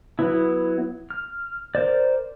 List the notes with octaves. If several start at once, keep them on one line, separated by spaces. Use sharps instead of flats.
F#3 B3 E4
F6
A#4 C5 D5